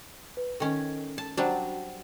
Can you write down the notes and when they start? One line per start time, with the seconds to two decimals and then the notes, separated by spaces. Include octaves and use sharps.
0.37 B4
0.60 D#3 C#4 A4
1.18 A5
1.37 F#3 G3 D4 F#4 C5 F#5